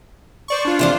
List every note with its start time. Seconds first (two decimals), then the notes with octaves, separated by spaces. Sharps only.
0.48 C5 D5 C#6
0.65 D4 F4
0.79 C3 C5 D5